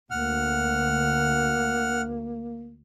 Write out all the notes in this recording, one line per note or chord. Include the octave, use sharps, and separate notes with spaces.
D2 A#3 F#5 F6